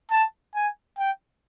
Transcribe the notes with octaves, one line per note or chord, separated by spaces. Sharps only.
A5
G#5
G5